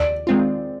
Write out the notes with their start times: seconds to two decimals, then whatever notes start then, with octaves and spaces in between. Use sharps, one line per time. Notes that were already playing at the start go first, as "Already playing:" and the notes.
Already playing: D#2 D5
0.27 D#3 G#3 C4 F4